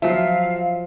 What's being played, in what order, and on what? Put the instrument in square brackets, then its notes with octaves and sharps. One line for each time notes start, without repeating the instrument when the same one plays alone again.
[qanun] F3 [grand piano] F#3 E5 [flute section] F5